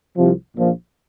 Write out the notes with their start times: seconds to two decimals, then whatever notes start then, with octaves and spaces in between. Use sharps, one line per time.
0.17 C2 C3 F3
0.56 A#1 A#2 F3